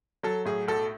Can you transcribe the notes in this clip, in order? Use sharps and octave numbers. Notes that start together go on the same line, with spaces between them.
F#3 A4
A2 G#4
B1 A4